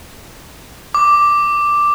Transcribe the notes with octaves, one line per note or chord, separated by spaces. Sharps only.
D6